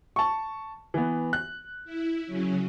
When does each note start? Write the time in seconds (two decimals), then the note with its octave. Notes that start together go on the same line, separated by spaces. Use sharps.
0.16 A5 C#6
0.94 E3 B3
1.33 F#6
1.84 E4
2.26 C#3 F#3 C#4